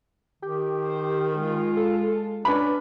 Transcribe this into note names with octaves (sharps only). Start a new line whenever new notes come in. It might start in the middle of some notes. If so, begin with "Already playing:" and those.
D#3 G4
C5
G#3 F4
A4
C#4 D4 B4 B5